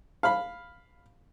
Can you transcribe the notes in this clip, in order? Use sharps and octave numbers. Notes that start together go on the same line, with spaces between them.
F5 B5